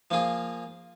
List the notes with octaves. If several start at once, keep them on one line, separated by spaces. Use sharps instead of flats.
F3 A#3 F4 G#4